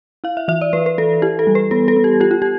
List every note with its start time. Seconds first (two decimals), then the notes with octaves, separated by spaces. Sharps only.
0.24 E4 F5
0.37 E5
0.48 E3 E5
0.61 D5
0.73 E3 B4
0.86 B4
0.98 E3 A4
1.22 E4 G4
1.39 A4
1.47 G3
1.55 B4
1.71 B3 A4
1.88 A4
1.96 B3
2.04 G4
2.20 F4 G4
2.31 F4
2.42 G4